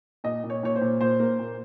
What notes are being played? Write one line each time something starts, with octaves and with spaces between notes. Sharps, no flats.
A#2 D#5
A#2
C#5
A#2 C#5
C5
A#2
A#2 C5
A#3
A#2